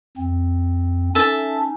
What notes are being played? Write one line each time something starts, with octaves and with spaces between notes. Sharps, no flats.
F2 C4
C#4 D#4 A4 E5 A5